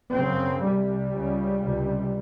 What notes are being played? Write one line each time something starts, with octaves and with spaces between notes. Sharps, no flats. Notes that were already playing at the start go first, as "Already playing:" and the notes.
F#2 C#3 C4
C2 C3 G3
C#2 C#3
C#2 C3